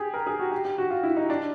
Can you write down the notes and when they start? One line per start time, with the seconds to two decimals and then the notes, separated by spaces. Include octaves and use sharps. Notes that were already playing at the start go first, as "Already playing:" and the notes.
Already playing: G4 G#4
0.14 A#4
0.27 G#4
0.39 F#4
0.51 G4
0.65 G4
0.78 F#4
0.90 F4
1.03 E4
1.17 D#4
1.30 D4